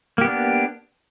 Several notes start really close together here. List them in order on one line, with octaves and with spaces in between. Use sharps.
A#3 G4 B3 D4